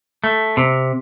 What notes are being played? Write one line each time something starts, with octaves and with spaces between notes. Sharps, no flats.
A3
C3